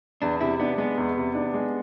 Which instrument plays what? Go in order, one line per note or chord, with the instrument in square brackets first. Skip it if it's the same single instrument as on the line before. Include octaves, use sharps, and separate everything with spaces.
[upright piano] E2 [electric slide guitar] D4
[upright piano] C3 [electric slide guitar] E4
[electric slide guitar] B3 [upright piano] D4
[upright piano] G#3 [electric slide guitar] B3
[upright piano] E2
C3
D4
G#3